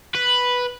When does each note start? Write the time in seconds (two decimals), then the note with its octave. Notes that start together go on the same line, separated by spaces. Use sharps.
0.15 B4